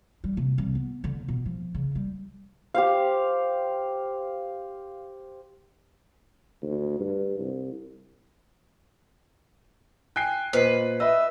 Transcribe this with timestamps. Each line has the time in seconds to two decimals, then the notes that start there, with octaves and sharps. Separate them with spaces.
0.24 G3
0.37 C3
0.58 C2
0.75 B3
1.04 D3
1.28 B2
1.46 F3
1.75 C#3
1.95 G3
2.74 G4 C5 F5
6.62 D2
7.00 G2
7.39 C2
10.16 G5 G#5 F#6 C7
10.53 A#2 B4 C5 D#5 C7
11.00 B4 D#5 E5 E6